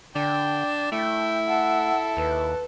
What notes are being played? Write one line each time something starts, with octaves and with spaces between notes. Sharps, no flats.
D3 D4 G5
A3 E4 G5
A4 F#5
D#2 B4